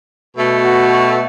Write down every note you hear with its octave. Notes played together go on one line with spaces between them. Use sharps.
B2 A3
F#4